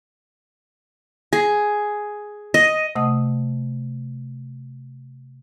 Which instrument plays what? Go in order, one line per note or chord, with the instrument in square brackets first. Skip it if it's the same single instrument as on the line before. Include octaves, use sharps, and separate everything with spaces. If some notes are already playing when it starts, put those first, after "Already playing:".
[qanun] G#4
D#5
[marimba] C3 A3 D#5 F#5 D#6